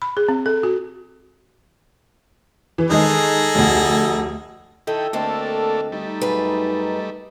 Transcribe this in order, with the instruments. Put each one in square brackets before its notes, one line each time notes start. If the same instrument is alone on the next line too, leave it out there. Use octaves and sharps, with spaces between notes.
[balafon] B5
G#4
C4
A4
F#4
[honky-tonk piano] E3
[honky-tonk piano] D#3 G#3 [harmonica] D#4 G#4 A4
[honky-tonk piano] F1 D2
[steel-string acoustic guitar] D#3 [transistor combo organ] D#4 E4 G5 [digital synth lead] A4
[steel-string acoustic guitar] D2 C4 D#5 [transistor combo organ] A3 A#3 D4
[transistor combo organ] G3 A3 [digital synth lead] D#4
[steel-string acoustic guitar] F#2 G#4 B4